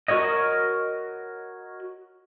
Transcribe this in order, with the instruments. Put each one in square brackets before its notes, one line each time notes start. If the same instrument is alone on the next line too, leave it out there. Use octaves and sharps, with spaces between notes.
[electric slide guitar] F#4 A#4 C#5 D#5